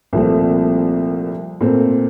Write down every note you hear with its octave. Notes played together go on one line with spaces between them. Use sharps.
C2 A#2 F3 A3 C4
A#2 A3 C4